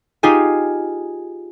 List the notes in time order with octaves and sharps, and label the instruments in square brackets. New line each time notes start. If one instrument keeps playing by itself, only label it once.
[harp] D#4 F4 G4 G#4 G#5